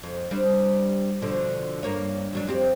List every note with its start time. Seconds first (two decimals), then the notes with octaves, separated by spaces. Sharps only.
0.03 F2
0.31 G3 C4 D4
1.21 B2 D3 F3
1.83 G2 A#3 C#5
2.33 E2 F#3 D4
2.47 F2 C4 G4